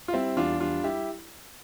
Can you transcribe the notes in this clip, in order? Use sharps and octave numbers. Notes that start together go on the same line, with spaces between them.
F4
G3 C4 E4
E2 D4 F4
G3 D4 F4
G3 E4 G4